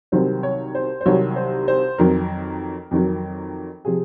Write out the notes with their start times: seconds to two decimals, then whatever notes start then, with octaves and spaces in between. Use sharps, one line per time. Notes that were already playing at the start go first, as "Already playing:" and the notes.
0.12 C2 C3 D#3 F#3 C5
0.43 C#5
0.75 C5
1.01 C5
1.06 C2 C3 D#3 F#3 C#5
1.36 C5
1.68 C5
1.98 F2 D#3 F#3 A#4
2.91 F2 D#3 F#3
3.85 C3 F3 G#4